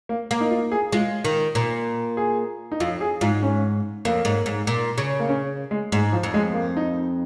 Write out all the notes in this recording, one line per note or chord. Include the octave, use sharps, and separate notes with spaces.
A#3
A#3
D#4
F4
G#4
G#3 F4
D#3
A#2
G#4
D#4
F2 F4
G#4
G#2 F4
C#4
F2 A#3
G#2
G#2
A#2
C#3
A#3
C#4
G#3
G#2 G#3
F3
F2
G#3
A#3
D#4